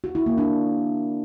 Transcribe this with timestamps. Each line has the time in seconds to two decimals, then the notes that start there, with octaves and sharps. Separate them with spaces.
0.04 F#4
0.15 E4
0.26 A#3
0.38 D4